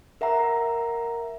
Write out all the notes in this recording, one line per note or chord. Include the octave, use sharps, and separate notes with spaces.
A#4 E5 F#5 A#5